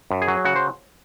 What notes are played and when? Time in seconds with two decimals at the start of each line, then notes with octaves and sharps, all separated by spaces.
0.11 F#2
0.22 G#4
0.28 F#3
0.45 C#3 F#4
0.56 C5